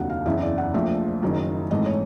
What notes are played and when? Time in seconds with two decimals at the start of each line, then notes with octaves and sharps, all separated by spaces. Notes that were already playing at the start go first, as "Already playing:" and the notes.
Already playing: F1 D#2 D3 F#3 F#5
0.10 F5
0.26 F#1 E2 C#3 E3 E5
0.42 D5
0.58 F#5
0.74 A#1 A#2 F3 A3 E5
1.23 F#1 F#2 D#3
1.70 G#1 G#2 E3 A3 D#5
1.86 C#5